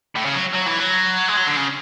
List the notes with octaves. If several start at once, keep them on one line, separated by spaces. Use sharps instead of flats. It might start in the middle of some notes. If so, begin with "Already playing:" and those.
A2
C#3
F#3
F#3
E3
F#3
G#3
F#3
D3
C#3